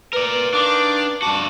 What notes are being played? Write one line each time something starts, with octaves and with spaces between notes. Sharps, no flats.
A#4 B4 D5
D#3 D4 F5 D6
G2 F#4 A5 D6